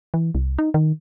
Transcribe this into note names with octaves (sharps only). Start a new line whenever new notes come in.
E3
C2
D#4
D#3